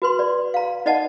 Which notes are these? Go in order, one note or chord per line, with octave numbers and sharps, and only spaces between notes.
F#4 B4 C6
D5
F5 A#5
D#4 D5 D#5 F#5 A5